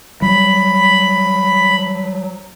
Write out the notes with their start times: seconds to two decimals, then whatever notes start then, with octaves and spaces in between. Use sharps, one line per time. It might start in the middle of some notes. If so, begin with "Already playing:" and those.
0.22 F#3 G3 B5